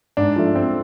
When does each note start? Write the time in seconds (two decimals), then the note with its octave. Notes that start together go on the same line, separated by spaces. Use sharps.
0.17 G#2 D4
0.36 F3 A3
0.55 G#2 C4